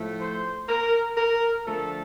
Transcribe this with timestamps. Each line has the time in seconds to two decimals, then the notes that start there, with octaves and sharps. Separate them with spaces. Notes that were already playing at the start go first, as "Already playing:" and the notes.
Already playing: A2 F3 A3
0.20 C5
0.69 A#4
1.17 A#4
1.65 D3 F3 A3 A4